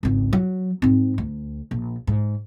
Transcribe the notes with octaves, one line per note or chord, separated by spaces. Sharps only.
G#1 C#2
F#3
G#2 C4
D2
A#1
G#2